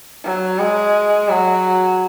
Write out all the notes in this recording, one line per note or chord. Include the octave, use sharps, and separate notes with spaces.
F#3
G#3
F#3